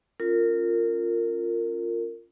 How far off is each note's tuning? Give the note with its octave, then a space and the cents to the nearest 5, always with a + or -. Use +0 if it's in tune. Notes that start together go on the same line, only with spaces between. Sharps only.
C#4 -5 F4 +0 A#4 -25